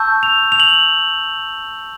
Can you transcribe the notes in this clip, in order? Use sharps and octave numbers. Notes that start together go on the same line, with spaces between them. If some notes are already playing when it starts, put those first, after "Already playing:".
Already playing: A5 C#6 E6 G6
F7
F7
F#7